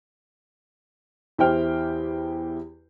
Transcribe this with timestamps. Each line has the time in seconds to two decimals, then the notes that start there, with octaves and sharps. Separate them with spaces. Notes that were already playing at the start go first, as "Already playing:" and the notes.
1.38 E2 E4 G4 C5 G5 F6